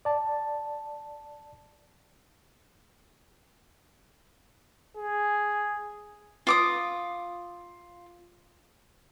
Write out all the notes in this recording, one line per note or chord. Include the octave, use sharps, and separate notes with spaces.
D5 A5
G#4
F4 D6 D#6